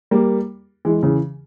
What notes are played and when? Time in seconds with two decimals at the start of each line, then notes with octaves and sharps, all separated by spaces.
0.11 G3 A#3
0.85 E3 G#3
1.03 C#3 E3